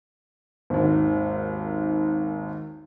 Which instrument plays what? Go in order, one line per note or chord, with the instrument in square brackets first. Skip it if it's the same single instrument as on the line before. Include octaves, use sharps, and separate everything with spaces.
[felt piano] G#1 D#2